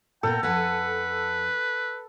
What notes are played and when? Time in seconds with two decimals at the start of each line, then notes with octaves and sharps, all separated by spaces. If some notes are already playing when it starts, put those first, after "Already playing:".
0.23 A#2 B3 A4 A#4 G5
0.43 F2 B4 F#5 G#5